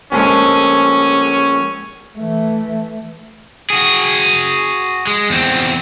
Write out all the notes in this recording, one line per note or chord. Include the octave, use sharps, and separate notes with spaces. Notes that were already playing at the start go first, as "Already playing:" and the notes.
A#1 G#3 A3 C#4
E3 A3
F#4 G#4
G#3
E2 C4